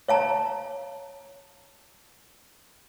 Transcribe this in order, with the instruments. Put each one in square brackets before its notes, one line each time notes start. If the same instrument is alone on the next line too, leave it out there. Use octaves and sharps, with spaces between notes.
[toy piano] C#5 F5 A5 A#5